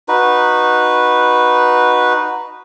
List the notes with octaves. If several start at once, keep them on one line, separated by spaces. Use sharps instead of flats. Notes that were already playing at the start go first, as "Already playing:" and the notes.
D#4 F#4 B4